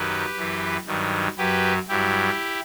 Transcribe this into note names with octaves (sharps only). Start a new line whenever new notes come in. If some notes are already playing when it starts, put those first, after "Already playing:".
Already playing: F#2 D#3 F#3 G4 B4
F#2 E3
G2 D#3 F#3
F#2 F#3 G4 B4
G2 F#3 E4 G4